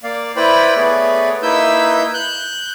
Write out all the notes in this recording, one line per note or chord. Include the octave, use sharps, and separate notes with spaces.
A#3 D5 F5
E4 B4 C5 D5 G5 B5
A3 B3 G#4 B4 C#5 D5
A#3 D#4 E4 B4 E6 G6
F#6 G6